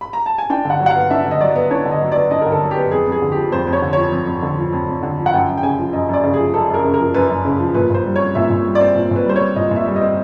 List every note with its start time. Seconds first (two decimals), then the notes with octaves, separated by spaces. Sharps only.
0.01 B5
0.13 A#5
0.26 A5
0.38 G#5
0.50 D4 G5
0.65 D3
0.70 F#5
0.80 F#3
0.86 F#5
0.90 F5
0.95 B3
1.10 D4 E5
1.26 D3
1.31 D#5
1.41 F#3 D5
1.56 B3
1.71 D4 C#5
1.85 D3
1.92 D#5
2.01 F#3
2.12 B3 D5
2.31 D4 D#5
2.42 D3 A#4
2.52 A4
2.61 F#3
2.71 G4
2.76 B3
2.91 F2 G#4
3.07 F2
3.12 G#4
3.22 D3
3.32 F3 G4
3.52 F2 C5
3.67 F2
3.73 C#5
3.82 D3
3.93 F3 C#5
4.12 F2
4.27 F2
4.42 D3
4.58 F3
4.73 F2
4.88 F2
5.03 D3
5.18 F3
5.26 F#5
5.33 F#2 G5
5.48 F#2
5.58 G5
5.63 C#3 G#5
5.79 F3
5.93 F#2 D#5
6.09 F#2 D5
6.24 C#3
6.34 G#4
6.39 F3
6.54 F#2 A4
6.69 F#2 A#4
6.84 C#3
6.94 A#4
7.00 F3
7.14 F#2 B4
7.30 F#2
7.45 C#3
7.60 F3
7.74 A#2 B4
7.90 A#2 C5
8.05 G3
8.16 C4 C#5
8.35 A#2 E5
8.50 A#2
8.65 G3
8.75 D5
8.80 C4
8.95 A#2
9.11 A#2 B4
9.26 G3 C5
9.36 C#5
9.41 C4
9.56 A#2 D#5
9.71 A#2 E5
9.86 G3
9.96 D#5
10.02 C4